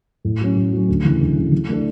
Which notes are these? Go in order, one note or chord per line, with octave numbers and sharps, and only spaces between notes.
A2
F#3 C#4
A2
F#3 C#4
D2
C#3 E3
D2
C#3 E3
E3
A3 D4 A4